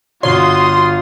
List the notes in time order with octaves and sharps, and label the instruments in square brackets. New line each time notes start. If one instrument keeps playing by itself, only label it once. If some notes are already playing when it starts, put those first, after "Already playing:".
[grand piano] G1 C#5 [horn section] F4 [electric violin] F#4 D#6 [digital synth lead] C6